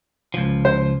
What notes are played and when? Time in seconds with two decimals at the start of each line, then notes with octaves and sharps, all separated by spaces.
0.34 C#2 F3
0.65 C5